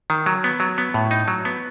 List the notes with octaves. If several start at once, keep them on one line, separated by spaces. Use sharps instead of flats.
D#3
F#3
B3
F#3
B3
A2
D#4
F#3
B3